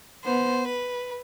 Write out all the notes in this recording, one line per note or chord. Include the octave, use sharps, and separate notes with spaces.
B3 C5
B4